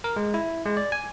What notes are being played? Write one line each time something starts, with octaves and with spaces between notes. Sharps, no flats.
A#4
G#3
E4
G#3
D5
G#5